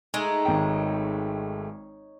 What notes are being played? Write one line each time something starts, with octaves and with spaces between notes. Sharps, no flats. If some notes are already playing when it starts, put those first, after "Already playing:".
G#3 A3 D#4
G#1 C#5 G5